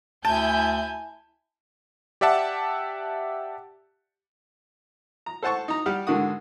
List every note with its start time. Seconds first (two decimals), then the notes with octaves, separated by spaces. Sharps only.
0.25 D2 E4 G#5 A5 G6
2.21 G4 D5 E5 F#5 A5
5.26 A#5
5.43 A4 C5 F#5 A5 C#6
5.68 D#4 A#5
5.86 G3 G4 F#5 F6
6.07 G#2 D3 D#3 F#4 D#6